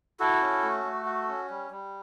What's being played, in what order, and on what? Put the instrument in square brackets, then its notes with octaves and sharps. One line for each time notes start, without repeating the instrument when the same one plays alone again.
[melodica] E4 F#4 A4
C#4
A3
A3
F#4
C#4
G3
G3